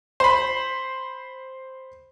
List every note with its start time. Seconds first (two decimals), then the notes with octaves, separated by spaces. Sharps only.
0.20 C5 B5